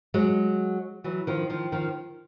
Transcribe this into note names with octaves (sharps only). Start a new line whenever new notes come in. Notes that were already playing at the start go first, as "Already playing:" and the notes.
F#3 G#3
E3 F#3
D#3 F3
D#3 F3
D#3 F3